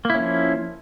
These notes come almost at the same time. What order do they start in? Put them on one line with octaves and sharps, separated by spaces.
A#3 E4 C#4 F3